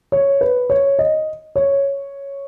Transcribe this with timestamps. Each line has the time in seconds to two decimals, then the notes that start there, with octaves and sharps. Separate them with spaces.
0.12 C#5
0.41 B4
0.70 C#5
0.99 D#5
1.56 C#5